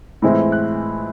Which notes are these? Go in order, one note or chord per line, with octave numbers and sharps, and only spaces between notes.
A2 E3 G#3 C4 E4
F#6